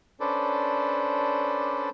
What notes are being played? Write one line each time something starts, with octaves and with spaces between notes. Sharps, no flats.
C#4 D4 A4 B4 C5 D5